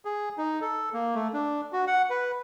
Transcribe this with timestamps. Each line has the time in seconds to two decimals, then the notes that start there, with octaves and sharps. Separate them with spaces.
0.05 G#4
0.38 D#4
0.61 A4
0.93 A#3
1.15 A3
1.34 D4
1.73 F#4
1.87 F#5
2.10 B4